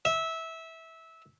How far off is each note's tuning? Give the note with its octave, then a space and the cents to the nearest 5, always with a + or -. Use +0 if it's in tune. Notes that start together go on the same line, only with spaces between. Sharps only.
E5 -15